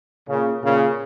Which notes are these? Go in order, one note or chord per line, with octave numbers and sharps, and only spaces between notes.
A#2 C#3
A#2 C#3